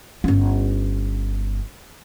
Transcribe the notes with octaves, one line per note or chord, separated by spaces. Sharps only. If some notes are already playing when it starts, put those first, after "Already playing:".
G1 C#4